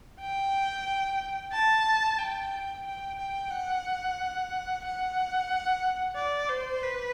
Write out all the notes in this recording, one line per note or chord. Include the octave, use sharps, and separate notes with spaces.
G5
A5
G5
G5
G5
F#5
F#5
D5
C5
B4